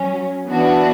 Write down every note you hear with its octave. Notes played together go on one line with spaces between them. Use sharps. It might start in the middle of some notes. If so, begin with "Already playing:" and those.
Already playing: F#3 C#4
E3 B3 D4 F#4